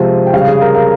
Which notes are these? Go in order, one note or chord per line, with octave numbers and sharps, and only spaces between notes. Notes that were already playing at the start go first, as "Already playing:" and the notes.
Already playing: C3 F3 G#3
G5
C#3 G3 F5
G#4
A#4
A#4